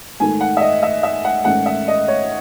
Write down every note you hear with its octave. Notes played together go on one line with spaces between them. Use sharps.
G#2 D#3 A3 G#5
F#5
E5
D#5
E5
E5
F#5
G#2 D#3 A3 C#4 F#5
E5
D#5
C#5